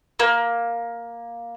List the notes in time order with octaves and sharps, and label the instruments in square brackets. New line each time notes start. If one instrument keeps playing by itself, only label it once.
[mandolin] A#3